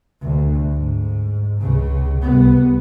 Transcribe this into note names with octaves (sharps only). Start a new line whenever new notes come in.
D2
G#2
C#2 C#3
C2 B3